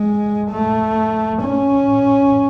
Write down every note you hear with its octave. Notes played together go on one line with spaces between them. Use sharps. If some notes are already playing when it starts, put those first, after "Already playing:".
Already playing: G#3
A3
C#4